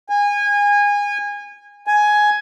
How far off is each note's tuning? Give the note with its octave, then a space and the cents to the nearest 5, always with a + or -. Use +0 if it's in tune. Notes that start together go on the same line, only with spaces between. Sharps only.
G#5 -25
G#5 +10